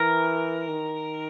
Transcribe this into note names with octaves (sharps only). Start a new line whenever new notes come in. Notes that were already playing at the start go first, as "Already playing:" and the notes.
Already playing: E3 A#4
D#3